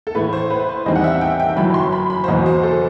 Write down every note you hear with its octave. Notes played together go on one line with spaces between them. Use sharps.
A4
A2 E3 A3 E4 B4
C5
B4
C5
E2 D#3 G3 C4 D#5
F#5
E5
G5
G5
G1 F#2 E3 B5
C6
B5
B5
C5
F#1 E2 B2 F#3 B3 D#5
C5
A4